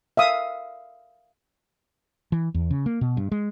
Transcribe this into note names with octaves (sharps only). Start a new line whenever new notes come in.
E5 F5 D#6
E3
E2
C#3
A#3
B2
G2
G#3